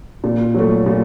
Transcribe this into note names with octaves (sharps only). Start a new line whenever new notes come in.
A#2
F#3 A3
A#2